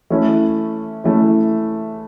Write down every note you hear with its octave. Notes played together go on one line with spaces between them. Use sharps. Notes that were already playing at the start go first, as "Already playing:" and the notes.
E3 A3 C#4 E4
E3 A3 C#4 E4